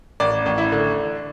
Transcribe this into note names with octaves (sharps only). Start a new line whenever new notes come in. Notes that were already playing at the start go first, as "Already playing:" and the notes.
A1 D5
A1
E4
D3